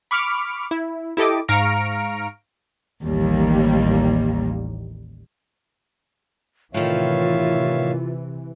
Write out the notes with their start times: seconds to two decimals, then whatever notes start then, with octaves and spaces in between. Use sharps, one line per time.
0.11 B5 C#6 D6 F6
0.71 E4
1.17 E4 G4 A4 D#5 D6
1.48 G#2 F5 A#5 C#6 F6 D7
3.06 A1 D#2 G3 A#3
6.74 A2 C3 D#3 E3 F4 C#5 E5 F5